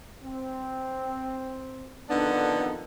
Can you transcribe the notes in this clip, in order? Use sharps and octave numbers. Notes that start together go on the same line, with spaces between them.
C4
F2 D3 D#3 B3 D4 D#4